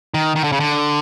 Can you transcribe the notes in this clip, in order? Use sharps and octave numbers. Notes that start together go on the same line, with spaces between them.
D#3
D#3
D3
C#3
D3